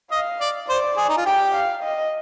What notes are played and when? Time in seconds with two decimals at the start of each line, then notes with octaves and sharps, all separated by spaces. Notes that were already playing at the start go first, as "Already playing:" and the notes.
0.11 D#5 F5
0.41 D5
0.69 C5 D5
0.97 G#4
1.09 D#4
1.17 F4
1.26 G4 G5
1.55 F5
1.83 D#5